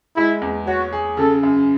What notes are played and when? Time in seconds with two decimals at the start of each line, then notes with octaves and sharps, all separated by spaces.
0.17 G#3 E4
0.42 E2
0.67 F#4 C#5
0.93 G#4
1.17 C#3 A4
1.43 F#2